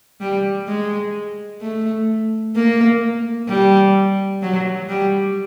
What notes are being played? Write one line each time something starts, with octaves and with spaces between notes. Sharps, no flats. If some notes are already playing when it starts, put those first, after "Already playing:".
G3
G#3
A3
A#3
G3
F#3
G3